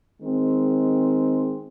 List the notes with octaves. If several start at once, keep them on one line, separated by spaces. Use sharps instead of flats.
D#3 G#3 C4